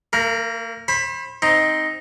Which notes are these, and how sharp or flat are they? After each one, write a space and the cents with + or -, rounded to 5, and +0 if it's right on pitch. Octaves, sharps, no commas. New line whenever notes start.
A#3 -35 A#4 +15
C5 +35 B5 +0
C4 +0 D#4 +5